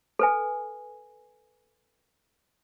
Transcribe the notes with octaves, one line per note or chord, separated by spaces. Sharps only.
A4 B4 G#5